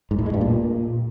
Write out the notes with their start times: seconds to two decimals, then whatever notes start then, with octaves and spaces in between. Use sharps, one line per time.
0.11 G#2
0.18 A2
0.26 G#3
0.34 G2
0.41 A#2